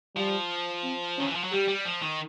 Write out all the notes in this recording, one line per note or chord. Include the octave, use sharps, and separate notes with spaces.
F3 G3
C4
D#3 C#4
E3
F3
F#3
G3 G4
G3
F3
D#3